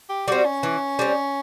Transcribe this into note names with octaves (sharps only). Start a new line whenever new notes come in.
G4
G3 C4 F#4
C#4
E3
G3 C4